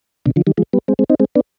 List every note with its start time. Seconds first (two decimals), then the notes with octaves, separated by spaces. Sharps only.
0.26 B2 D3
0.36 D3 F3
0.47 D#3 G3
0.58 F3 G#3
0.73 G3 B3
0.88 G#3 C4
0.99 G#3 C4
1.10 C4 D#4
1.20 G#3 C4
1.35 B3 D4